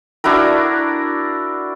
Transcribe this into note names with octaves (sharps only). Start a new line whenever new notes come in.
D4 E4 F#4 A#4